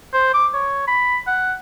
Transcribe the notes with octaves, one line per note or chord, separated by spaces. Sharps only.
C5
D6
C#5
B5
F#5